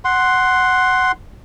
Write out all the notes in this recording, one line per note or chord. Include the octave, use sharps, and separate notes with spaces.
F#5 C6